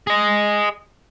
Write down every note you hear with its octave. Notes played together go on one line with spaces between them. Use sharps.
G#4 D#5